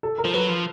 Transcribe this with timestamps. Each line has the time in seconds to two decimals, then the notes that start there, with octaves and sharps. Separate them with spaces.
0.03 A4
0.18 A#4
0.25 F3
0.34 F#3 B4
0.49 F3